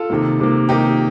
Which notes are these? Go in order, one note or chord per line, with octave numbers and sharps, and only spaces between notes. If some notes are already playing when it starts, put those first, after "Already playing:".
Already playing: F4 A4
C3 D#3 A#3
C3 D#3 A#3
C3 D#3 A#3 D#4 G4